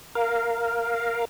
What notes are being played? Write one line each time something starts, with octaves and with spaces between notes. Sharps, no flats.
A#4 F5